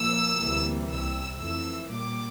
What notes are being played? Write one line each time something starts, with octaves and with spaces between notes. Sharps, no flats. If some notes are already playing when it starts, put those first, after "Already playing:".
Already playing: A#2 F3 A#3 E6
D2 C3 E3 G3 A#3
C2 C3 G3 E6
F2 E3 A3 E6
A#2 G3 A#3 D6